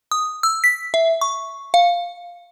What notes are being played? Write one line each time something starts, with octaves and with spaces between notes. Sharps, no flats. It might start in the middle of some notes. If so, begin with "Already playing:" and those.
D#6
E6
B6
E5
C#6
F5